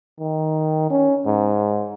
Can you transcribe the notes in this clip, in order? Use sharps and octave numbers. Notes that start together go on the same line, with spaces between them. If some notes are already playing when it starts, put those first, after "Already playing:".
D#3
C#4
G#2